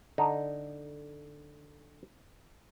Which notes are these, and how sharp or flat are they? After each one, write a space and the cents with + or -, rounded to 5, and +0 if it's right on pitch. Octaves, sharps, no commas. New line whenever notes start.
D3 +0 D#4 +0